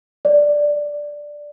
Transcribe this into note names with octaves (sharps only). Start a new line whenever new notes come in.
D5